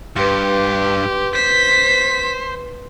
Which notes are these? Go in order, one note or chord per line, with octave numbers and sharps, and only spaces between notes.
G2 G4 B4 C6
C5 B6